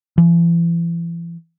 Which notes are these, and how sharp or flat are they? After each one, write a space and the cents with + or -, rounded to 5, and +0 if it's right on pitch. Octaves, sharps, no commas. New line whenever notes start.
E3 +40